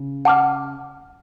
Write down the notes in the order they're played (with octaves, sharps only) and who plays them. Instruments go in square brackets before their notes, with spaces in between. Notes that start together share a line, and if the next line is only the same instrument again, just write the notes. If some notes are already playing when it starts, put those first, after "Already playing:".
Already playing: [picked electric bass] C#3
[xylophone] F#5 A5 D6 F6